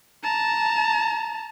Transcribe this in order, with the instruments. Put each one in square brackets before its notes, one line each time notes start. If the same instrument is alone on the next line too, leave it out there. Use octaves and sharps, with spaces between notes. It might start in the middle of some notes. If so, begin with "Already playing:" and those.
[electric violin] A5 A#5